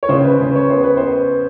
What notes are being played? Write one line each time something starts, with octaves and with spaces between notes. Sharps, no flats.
C#5
C#3 C5
B4
C#3 B4
C#5
B3 C5
B4
C5